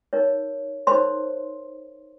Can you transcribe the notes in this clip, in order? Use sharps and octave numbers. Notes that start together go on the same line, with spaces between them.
D#4 A#4 C#5
D#4 A#4 C5 C#5 C6